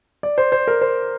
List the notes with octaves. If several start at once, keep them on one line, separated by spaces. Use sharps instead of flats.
D5
C5
C5
A#4
C5